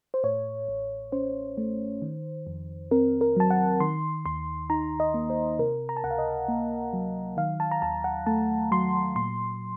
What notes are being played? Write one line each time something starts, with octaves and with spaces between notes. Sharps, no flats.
C5
A2 C#5
A1
C#4 C5
A3
D#3
F2
C4 A#4
A#4
F#3 A5
F#5
D#3 C6
D#2 C6
D#4 A#5
D#5
A#3
C5
C3 A#4
A#5
A5
C#2 F#5
F5
D#5
A#3
F#3
D#3 F5
A5
A#5
D#2 A5
F#5
A3 A5
F#3 C6
A#2 C6